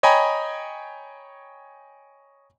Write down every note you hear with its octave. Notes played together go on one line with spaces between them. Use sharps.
C#5 D#5 G5 G#5 A#5 B5